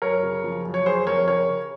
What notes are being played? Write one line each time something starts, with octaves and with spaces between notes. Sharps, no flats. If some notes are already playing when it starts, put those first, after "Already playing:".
F#2 A#4 C#5
C#3
F3
F#2
C#5
F#3 G#4 C5
F2 A#4 C#5
C#3 A#4 C#5
C#3